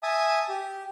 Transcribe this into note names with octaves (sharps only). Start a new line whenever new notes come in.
E5 G#5 A5 D#6
G4